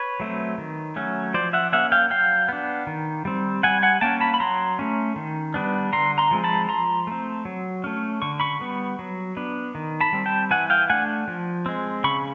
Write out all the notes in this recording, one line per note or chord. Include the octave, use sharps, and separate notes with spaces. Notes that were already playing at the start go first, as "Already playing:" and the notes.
Already playing: B4 C#5
F#3 A3 C4
D#3
F#3 A3 C#4
F3 C5 D5
E5 F#5
A#3 C#4 E5 F#5
F5 G5
F#3 F5 G5
B3 D4
D#3
G3 C4
G3 F#5 G#5
F#5 G#5
A#3 C#4 G5 A5
A5 B5
B5
F#3 A#5 C6
A3 C#4
D#3
G3 B3 D4
D3 A#5 C6
A#5 C6
F3 G#3 C4
A5 B5
F3 A#5 C6
A3 C4
F#3
A3 C#4
D3 C#6
B5 C#6
G3 B3
F#3
B3 D4
D#3
A5 B5
G3 C4
G5 A5
E3 F#5 G#5
F5 G5
A3 D4 F#5 G#5
F3
G#3 C4
C#3 B5 C#6